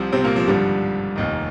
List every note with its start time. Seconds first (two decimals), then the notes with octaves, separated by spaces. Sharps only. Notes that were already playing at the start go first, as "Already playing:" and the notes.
Already playing: C2 C3 F3 C4
0.12 C3 C4
0.24 A#2 A#3
0.36 F3
0.47 G#1 G2 D3 F3 G3
1.16 F1 D#2 D#3